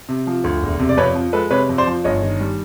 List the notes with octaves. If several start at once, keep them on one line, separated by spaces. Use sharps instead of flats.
C3
F3
D2
E1
C3
D5
F2 B4 C#5
F3
G#3 A4 B4
C3 B4 C#5
F2
C5 D5
F3
G1 C#5 D#5
D#3
G3